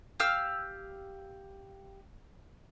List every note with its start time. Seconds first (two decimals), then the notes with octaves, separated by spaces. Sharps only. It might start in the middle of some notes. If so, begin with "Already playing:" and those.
0.20 G4 F5 E6 F6